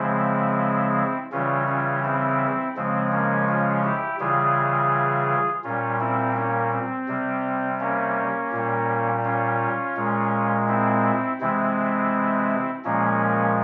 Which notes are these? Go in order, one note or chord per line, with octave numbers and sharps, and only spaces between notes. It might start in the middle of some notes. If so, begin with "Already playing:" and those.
Already playing: C#3 F3 G#3 C4 E4
C#3 E3 G3 C#4 F4
C#4 F4
C4 E4
C#3 F3 G#3 C4
A#3 C#4
C#4 F4
E4 G4
C#3 E3 G3 F4 G#4
A#2 G3 C#4 F4
C4 E4
A#3 C#4
C4
C3 G3
A#3 C#4
A#2 G3
C#4 F4
A#2 G#3
C4 E4
C3 E3 G#3 C4 E4
A#2 F3 G#3 A#3 C#4